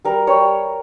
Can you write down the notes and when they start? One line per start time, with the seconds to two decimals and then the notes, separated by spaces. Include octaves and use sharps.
0.05 G3 A#4
0.27 G3 C#5